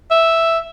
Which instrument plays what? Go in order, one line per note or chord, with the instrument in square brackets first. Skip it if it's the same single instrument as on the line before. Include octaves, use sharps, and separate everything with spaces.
[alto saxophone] E5